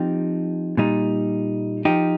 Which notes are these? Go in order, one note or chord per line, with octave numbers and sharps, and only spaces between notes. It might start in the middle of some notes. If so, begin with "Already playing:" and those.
Already playing: F3 C4 D#4 G4
A#2 G3 D#4
F3 D#4 G4